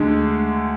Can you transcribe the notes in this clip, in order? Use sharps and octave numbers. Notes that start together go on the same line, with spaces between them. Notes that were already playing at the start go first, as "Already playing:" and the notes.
Already playing: D2 D3 G#3